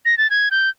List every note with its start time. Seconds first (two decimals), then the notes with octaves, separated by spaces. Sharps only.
0.05 A#6
0.18 A6
0.30 G#6
0.51 G6